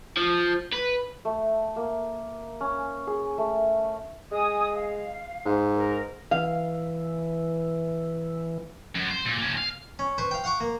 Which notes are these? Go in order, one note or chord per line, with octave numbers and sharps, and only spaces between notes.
F3
B4
A3
A#3
C#4
G#4
A3
G#3 G#5 D#6
F5
G#2
A#4
E3 F5
F#2
C5
A#2
A#3 C#4
F5
C#4
B4 C5 C#6
F5 G5
F5 F#5 C#6 D6
A#3